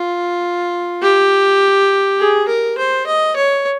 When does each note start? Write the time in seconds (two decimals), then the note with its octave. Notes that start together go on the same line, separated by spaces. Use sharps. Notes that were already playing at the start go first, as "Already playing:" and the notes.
Already playing: F4
1.02 G4
2.19 G#4
2.48 A#4
2.78 C5
3.07 D#5
3.36 C#5